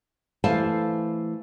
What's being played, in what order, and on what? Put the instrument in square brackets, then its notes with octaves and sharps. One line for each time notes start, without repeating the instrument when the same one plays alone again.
[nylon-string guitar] E3 A3 C5 F5 G#5 A5